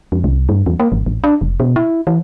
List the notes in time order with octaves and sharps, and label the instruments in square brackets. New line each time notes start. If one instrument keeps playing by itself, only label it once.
[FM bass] F2
C2
G2
E2
A#3
G#1
A1
D4
F1
B2
E4
E3